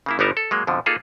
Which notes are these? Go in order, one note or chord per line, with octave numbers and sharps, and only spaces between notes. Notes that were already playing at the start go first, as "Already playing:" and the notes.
C#3 A#3 E4
G1 G3 B3 D#4 A#4 A5
A4
F#3 G#3 A#3
F2 B2 D3 F3
A#3 D#4 F4 G#4 A4